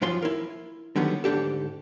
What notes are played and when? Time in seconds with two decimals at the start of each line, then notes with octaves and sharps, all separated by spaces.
0.02 F#2 E3 F3 F4 C6
0.22 E4 A#4
0.96 D3 D#3 F#3 G3 B3
1.24 D2 G#2 D4 G4 A4